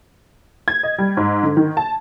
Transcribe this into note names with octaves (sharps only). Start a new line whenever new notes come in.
G#6
D#5
G3
G#2
D3
D#3
A5